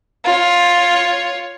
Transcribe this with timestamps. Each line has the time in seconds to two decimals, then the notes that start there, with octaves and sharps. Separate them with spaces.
0.25 F4 C#5